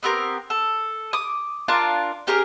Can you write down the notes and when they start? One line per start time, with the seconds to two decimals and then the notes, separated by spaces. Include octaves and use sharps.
0.03 B3 C4 G4 A#4
0.50 A4
1.13 D6 D#6
1.68 D4 F4 A#4 A5
2.27 C#4 G4 G#4 A#4